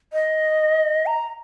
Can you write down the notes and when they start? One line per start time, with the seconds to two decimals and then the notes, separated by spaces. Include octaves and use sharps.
0.13 D#5
1.06 A#5